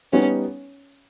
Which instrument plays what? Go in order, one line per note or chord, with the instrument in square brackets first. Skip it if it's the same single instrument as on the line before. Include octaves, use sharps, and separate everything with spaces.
[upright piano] G3 B3 D#4 [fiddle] C#4